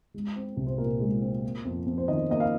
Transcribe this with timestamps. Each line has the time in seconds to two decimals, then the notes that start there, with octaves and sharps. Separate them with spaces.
0.14 G#3
0.36 C4
0.57 C2
0.67 C5
0.78 A#2 A#4
1.00 G#3
1.21 C4
1.44 A#3
1.65 F2
1.86 F2
1.98 C5
2.08 D#3 D#5
2.30 A#3 D#5
2.40 F5